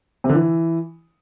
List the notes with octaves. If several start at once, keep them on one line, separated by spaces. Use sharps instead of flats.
C3
D3
E3